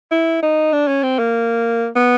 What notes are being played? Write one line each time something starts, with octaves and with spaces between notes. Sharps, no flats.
E4
D#4
D4
C#4
C4
A#3
B3